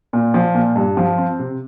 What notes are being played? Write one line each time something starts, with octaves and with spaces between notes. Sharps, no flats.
A#2
F3
A#2
G2
F3
C4
C3